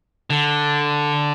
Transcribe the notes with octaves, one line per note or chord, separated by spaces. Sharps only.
D3